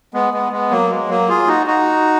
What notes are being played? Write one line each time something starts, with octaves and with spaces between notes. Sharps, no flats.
G#3 B3
G#3 B3
G#3 B3
F#3 A#3
G#3
F#3 A#3
F4 G#4
D#4 F#4
D#4 F#4